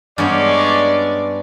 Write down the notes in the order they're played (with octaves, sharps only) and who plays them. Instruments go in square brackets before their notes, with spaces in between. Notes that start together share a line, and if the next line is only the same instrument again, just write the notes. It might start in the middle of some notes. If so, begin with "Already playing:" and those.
[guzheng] G2 B3 [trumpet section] G#3 C#4 D5